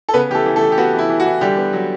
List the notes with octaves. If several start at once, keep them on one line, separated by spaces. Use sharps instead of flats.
A4
C#3 B3 B4
E3 A3 G4 A4
E3
A3 A4
E3
G4
B3 F#4
E3
E4
E3
F#4
E3
D3 G3 G4
B3
F#3